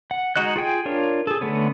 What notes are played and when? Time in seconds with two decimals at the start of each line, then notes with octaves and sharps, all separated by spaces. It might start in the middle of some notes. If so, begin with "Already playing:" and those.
0.11 F#5
0.36 G#3 D#4 F#4 D#5 F#6
0.56 F4 G#4 G5 G#5
0.86 D4 F4 A#4 C#5
1.27 G#4 A4
1.41 D3 A3 B3 C#4